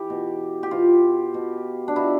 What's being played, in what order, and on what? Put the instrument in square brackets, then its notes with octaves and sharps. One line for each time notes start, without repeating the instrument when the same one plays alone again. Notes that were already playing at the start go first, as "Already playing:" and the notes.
Already playing: [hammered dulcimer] E3 G4
B2
G4
B2 F4
B2
D4
B2 E4